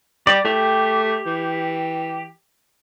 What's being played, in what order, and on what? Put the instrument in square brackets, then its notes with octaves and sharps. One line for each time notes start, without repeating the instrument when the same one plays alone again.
[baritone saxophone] G3 [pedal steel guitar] D5
[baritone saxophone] A3 [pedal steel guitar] G4
[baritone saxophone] E3